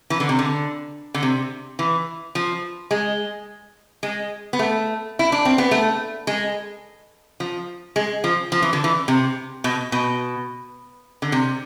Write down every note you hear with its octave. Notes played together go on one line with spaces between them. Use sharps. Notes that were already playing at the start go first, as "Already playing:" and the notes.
E3
D3
C3
D3
D3
C3
E3
F3
G#3
G#3
B3
A3
E4
D4
C4
B3
A3
G#3
F3
G#3
F3
F3
E3
D3
E3
C3
B2
B2
D3
C3